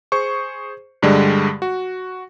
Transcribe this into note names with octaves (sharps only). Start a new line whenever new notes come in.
G#4 C5 C#6
G2 D3 G3 G#3
F#4